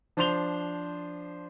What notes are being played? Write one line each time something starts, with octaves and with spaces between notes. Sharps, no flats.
F3 D4 C5 C6 F7 G7